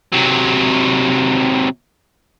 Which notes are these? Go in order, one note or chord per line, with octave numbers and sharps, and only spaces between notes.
C3 F#3